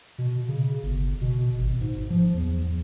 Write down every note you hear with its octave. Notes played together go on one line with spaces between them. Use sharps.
B2
C#3
G1
B2
G#1
G#2
F3
E2